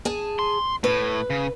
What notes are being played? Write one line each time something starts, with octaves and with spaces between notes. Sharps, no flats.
G#4 G#5 A5
C6
A2 B4
C#3